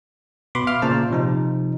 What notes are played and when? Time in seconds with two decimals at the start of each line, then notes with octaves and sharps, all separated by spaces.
0.55 B2 B4 B5 C6 D6
0.67 E5 F5 D6 F6
0.82 A#2 C#3 C5 A5
1.11 C3 F3 D#4